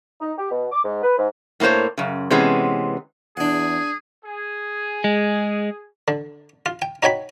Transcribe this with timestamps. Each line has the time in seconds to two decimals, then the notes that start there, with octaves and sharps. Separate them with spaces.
0.21 D#4
0.38 G4
0.51 B2
0.71 D6
0.85 G#2
1.03 B4
1.18 G#2
1.60 A2 A#3 C#4 C5 C#5
1.98 F#2 C#3
2.30 C3 E3 G#3 B3 C#4
3.37 E2 D4 G#4 F#5
4.25 G#4
5.04 G#3
6.08 D3
6.66 F4
6.82 G5
7.03 D#4 F#4 C#5 G5 B5